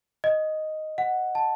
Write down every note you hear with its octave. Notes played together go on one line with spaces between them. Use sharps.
D#5
F#5
A5